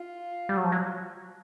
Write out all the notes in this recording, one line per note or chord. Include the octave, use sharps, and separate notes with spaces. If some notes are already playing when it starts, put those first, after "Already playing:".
Already playing: F4
G3
F#3
F3
F#3